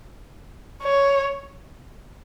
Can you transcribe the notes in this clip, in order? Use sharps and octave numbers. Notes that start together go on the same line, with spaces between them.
C#5